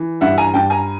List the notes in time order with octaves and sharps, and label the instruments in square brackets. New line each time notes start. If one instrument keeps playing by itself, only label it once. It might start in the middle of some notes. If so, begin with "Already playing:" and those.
Already playing: [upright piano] E3
G2 E5 F#5
G#5 A#5
G2 G5 A5
G#5 A#5